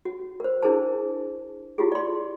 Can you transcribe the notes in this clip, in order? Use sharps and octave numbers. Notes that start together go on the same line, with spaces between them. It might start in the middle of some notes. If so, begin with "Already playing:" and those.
F#4
A#4 C5
D4 E4 G#4 A#4 C5 A5
E4 F4 G4 G#4
D5 C6